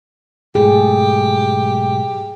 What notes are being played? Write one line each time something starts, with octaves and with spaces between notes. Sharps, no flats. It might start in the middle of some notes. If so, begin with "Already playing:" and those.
B1 G#2 A3 G4 G#4